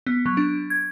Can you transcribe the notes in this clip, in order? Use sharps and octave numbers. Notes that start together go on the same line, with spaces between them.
B3
F#3
D4
G#6